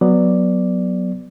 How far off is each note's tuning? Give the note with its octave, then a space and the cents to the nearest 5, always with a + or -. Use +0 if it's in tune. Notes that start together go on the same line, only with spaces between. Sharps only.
F#3 +0 B3 +0 D5 +0